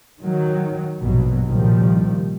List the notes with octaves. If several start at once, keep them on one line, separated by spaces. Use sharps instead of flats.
D#3 F#3
A#1 G2 B2 F#3
C2 A#2 D#3 F3 G3